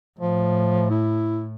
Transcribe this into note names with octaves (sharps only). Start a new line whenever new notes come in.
A2 F3
E4